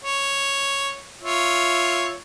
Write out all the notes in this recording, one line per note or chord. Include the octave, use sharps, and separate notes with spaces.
C#5
F4 C#5 E5